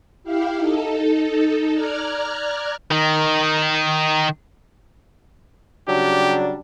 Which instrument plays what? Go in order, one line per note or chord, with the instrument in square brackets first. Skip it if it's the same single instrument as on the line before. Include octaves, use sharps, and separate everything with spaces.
[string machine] E4 G4 F5
D#4 A4
D5 A#5 F6 F#6 G#6
[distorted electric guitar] D#3 D#4
[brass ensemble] C#3 G3 D4 [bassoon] F#3 [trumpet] G4